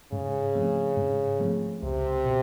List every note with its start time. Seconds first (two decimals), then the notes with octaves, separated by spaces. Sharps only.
0.12 G#2 C#3
0.55 F3 A3 C4
0.97 G#2
1.40 F3 A3 C4
1.83 C#2 C3
2.25 B2